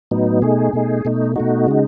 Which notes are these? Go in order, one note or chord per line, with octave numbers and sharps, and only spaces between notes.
A2 F#3 B3 D#4
B2 A3 D#4 G#4
B2 A3 D#4
B2 A3 D#4
B2 A3 D#4 F#4
C#3 G#3 D#4